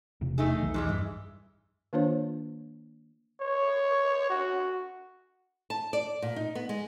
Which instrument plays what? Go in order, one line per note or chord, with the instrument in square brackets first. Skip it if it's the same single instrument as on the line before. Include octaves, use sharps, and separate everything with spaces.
[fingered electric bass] E1 C3
[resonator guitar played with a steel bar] A3 D#4 G#4
[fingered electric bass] B1 E2 E3
[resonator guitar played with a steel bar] G#2 G3 G#3
[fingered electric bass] G2 [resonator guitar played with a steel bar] E3
[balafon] D#3 A#3 D4 F4 C5 C#5
[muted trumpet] C#5
F#4
[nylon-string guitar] A5
D5
A#2
D#4
B3
G#3